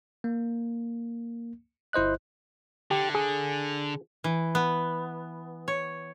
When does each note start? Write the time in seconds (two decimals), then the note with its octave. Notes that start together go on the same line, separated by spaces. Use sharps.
0.24 A#3
1.93 G1 E4 C5 D#5 F#6
2.91 D3 G4
3.15 G#4
4.24 E3
4.55 B3
5.68 C#5